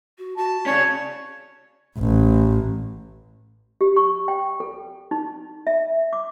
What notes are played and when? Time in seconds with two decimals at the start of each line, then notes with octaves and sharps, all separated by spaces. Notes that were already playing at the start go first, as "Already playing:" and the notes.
0.18 F#4
0.37 F#4 A5
0.66 C#3 C#4 C#5 D5
1.98 A1
3.81 G4
3.97 C#6
4.28 G5
4.60 A4
5.11 D#4
5.67 E5
6.13 D6